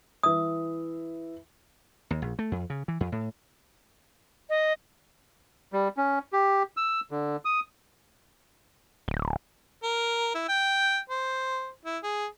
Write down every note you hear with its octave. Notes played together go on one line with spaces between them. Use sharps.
E3 E5 D#6
D#2
A#1
A3
F2
C#3
E3
F2
A2
D#5
G3
C#4
G4
E6
D3
D#6
D1
A#4
E4
G5
C5
E4
G#4